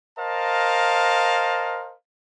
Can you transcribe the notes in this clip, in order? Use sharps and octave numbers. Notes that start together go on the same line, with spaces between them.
A#4 C5 D#5 F5 A5